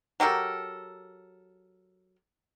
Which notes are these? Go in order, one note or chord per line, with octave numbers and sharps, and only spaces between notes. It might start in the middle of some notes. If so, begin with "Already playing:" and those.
F#3 G4 A4 A#4